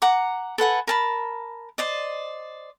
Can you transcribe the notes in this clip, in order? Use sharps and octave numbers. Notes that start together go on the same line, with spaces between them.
F#5 A#5 D6
A4 B4 F#5 G#5
A#4 A5 B5
C5 D5 D#5